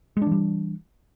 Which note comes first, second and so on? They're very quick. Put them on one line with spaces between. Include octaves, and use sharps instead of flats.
G#3 D4 E3 G3